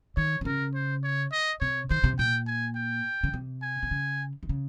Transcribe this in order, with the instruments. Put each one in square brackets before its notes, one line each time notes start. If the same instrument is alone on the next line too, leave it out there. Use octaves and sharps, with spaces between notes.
[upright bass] D#3 [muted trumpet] C#5
[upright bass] C3
[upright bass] C#3 [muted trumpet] A#4
[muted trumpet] C5
C#5
D#5
[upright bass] C3 [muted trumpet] C#5
[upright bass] D#3 [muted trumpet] C5
[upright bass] C3
[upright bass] A#2 [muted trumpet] G5
[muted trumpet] G#5
G5
[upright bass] C#3
C3
[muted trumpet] G#5
[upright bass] C3
C#3
D#3
C#3